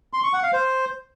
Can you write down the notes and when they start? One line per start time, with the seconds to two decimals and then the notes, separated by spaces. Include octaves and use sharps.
0.13 C6
0.23 C#6
0.33 F#5
0.43 F5
0.53 C5